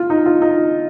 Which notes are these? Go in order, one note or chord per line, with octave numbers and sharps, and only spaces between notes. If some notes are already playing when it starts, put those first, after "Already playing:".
Already playing: F4
D#4
F4
D#4